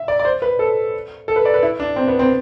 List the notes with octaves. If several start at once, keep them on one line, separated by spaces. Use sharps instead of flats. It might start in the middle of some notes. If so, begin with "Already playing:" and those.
Already playing: E5
D5
D5
C5
B4
A4
A4
B4
D5
B4
E4
D4
C4
B3
C4